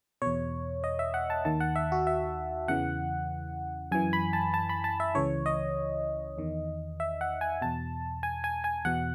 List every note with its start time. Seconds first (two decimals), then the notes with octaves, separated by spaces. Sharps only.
0.22 E2 B2 C#5
0.84 D#5
0.99 E5
1.14 F#5
1.30 A5
1.45 D#2 D#3 A5
1.60 F#5
1.76 E5
1.92 F#4
2.07 E5
2.68 E2 C#3 E3 F#5
3.92 F#2 E3 G#5
4.13 B5
4.33 A5
4.54 A5
4.69 B5
4.84 A5
5.00 E5
5.15 C#2 C#3 E3 C#5
5.46 D#5
6.38 E2 D#3
7.00 E5
7.21 F#5
7.41 G#5
7.62 E2 B2 A5
8.23 G#5
8.44 G#5
8.64 G#5
8.85 E2 B2 F#5